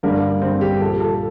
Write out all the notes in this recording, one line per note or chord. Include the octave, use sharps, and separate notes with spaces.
G2 D3 G3 A#3
G2 D3 G3 C4
G4
A#2 F3 A4
A4